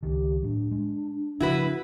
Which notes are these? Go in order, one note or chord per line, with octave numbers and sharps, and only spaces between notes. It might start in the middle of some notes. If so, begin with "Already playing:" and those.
C#2 D#3 G4
A2 F#3 D4
G#3
C#3 F3 C4 E4 F#4 B4